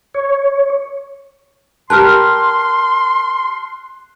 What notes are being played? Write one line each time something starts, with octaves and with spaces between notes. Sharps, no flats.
C#5
G4 A#4 B4 A5 C6 F6 F#6